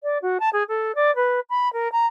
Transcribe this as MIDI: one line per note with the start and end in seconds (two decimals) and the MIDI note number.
0.03 0.18 74
0.22 0.38 66
0.40 0.50 81
0.53 0.63 68
0.69 0.92 69
0.95 1.14 74
1.16 1.40 71
1.50 1.71 83
1.73 1.91 70
1.92 2.06 82